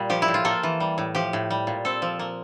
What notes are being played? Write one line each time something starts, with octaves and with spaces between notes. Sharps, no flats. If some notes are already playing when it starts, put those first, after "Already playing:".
Already playing: A#2 G3
F3 G4
E4
A2
F4
A#3 A4
E3
G3
A2
F3 G4
A2
G3
A#2
C4 A4
F3
A#3